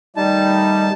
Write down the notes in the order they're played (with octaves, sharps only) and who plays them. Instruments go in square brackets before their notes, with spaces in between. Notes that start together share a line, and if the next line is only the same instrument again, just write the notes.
[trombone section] D#3 A3 D#4 [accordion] G3 [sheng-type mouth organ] A5